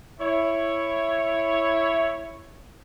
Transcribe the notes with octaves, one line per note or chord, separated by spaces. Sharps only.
E4 C#5